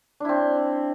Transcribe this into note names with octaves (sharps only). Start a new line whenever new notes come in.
C4 D4 E4